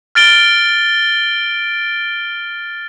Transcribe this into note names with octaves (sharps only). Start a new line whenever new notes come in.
F6 A6 D7 G7